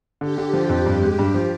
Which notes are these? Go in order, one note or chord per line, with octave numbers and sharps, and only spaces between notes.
D3 G4
D3
F3
F2
G2
G#3
G2
F3